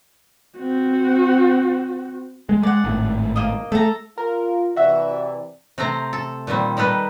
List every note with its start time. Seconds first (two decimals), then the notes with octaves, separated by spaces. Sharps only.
0.58 C4 F#4
2.49 G#3
2.63 G#3 D5 F#5
2.84 G#1 A2
3.36 A#3 D#5
3.72 A3 A4 A#5
4.18 F4 A#4
4.76 C3 E3 F#4 D5 E5
5.78 C3 A3 C4 C5 A#5
6.13 A4
6.47 A#2 D#3 G3 C4
6.77 G3 D#4 A4 B4